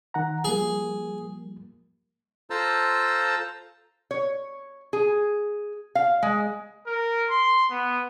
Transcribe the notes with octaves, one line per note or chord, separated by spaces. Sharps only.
D#3 F#5 A#5
F3 G3 A#3 G#4
F4 A4 C5 A5 A#5 E6
C#5
G#4
F5
G#3
A#4
C6
B3